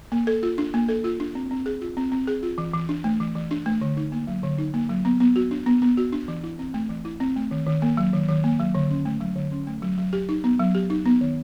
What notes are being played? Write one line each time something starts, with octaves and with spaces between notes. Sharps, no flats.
A#3
A4
F4
D4
A#3
A4
F4
D4
C4
C4
G#4
F4
C4
C4
G#4
F4
E3
E3
D4
A3
E3
E3
D4
A3
D3
D#4
A#3
F#3
D3
D#4
A#3
F#3
B3
B3
F#4
D4
B3
B3
F#4
D4
E3
E4
C4
A3
E3
E4
C4
A3
D#3
D#3
A#3
F#3
D#3
D#3
A#3
F#3
D3
C#4
A3
F#3
D3
C#4
A3
F#3
F#3
G4
D#4
B3
F#3
G4
D#4
B3
D#3